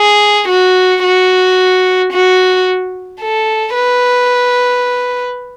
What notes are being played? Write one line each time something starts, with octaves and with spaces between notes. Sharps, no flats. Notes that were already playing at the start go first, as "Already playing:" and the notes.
Already playing: G#4
F#4
F#4
F#4
A4
B4